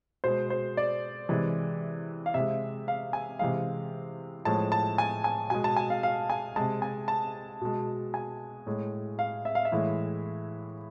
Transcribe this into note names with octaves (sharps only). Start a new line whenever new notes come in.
B2 G#3 C5
C5
D5
C3 E3 G#3
F5
C3 G#3 E5
F5
G#5
C3 E3 G#3 F5
A2 F3 G#3 A5
A5
G#5
G#5
B2 G#3 G#5
A5
G#5
F5
F5
G#5
C3 G#3 A5
G#5
A5
B2 G#3
G#5
A2 G#3
F5
E5
F5
E5
A2 E3 G#3